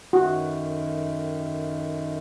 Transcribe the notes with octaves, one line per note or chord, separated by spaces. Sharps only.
F#2 D#3 A3 F#4